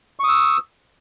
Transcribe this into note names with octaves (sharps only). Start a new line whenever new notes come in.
C#6 D#6 E6